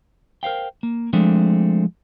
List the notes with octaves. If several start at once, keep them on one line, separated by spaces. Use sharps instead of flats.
A#4 C5 F5 G5
A#3
F3 G#3 A3 C4 D4